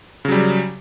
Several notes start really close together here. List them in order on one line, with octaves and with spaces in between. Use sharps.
C#3 F#3 G3